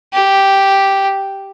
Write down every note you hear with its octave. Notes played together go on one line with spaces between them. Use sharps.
G4